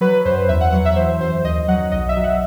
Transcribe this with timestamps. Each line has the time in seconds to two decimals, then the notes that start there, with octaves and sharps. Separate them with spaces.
0.01 F#3 B4
0.25 F#2 C5
0.49 E2 E5
0.61 F#5
0.72 F#3 F#5
0.85 E5
0.96 E3 C5
1.20 F#2 C5
1.44 D#2 D#5
1.68 F#3 F#5
1.92 B1 D#5
2.09 E5
2.16 F#3
2.24 F#5